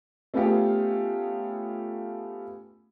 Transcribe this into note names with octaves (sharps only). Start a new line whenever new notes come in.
A3 B3 C#4 F4 G4 G#4